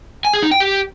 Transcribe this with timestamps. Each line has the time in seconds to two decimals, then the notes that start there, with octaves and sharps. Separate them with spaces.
0.25 G#5
0.34 G#4
0.43 D#4
0.51 G5
0.60 G4